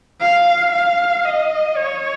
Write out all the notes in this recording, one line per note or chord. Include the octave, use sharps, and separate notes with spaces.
F5
F5
D#5
C#5